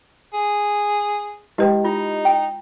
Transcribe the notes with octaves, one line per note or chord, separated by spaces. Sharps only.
G#4
G#3 E4 G4 B4 D#5 G5
D#4 F4
G5